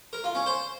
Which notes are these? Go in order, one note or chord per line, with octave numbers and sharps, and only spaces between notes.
A#4
F4
C#4
C5